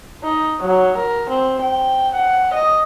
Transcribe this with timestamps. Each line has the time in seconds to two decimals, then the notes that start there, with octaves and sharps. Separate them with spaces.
0.24 D#4
0.61 F#3
0.97 A#4
1.30 C4
1.62 G5
2.14 F#5
2.54 D#5